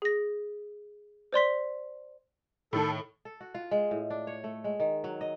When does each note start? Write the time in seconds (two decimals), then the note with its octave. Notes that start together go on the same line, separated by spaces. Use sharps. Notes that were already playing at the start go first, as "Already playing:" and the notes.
0.02 G#4 A#6
1.33 C5 D5 C6 B6
2.73 A2 D#3 A4
3.25 A4
3.41 F#4
3.54 F4
3.71 G#3
3.91 A2
4.10 D4
4.27 C#5
4.44 A3
4.64 G#3
4.80 D#3
5.04 F#3
5.21 D#5